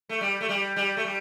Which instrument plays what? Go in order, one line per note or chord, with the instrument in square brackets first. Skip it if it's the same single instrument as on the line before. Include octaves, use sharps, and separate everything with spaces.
[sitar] A3
G3
A3
G3
G3
A3
G3